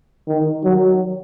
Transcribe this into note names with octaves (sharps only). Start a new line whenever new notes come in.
D#3
F#3